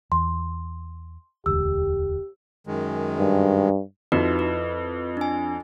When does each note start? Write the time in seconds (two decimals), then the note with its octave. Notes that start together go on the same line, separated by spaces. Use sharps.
0.12 E2 C6
1.46 E1 D2 G4 E6
2.67 F#2 D#3 G#3
3.19 G2
4.12 F2 D#4 E4 F#4 B4
4.39 B4
5.17 D4 G#5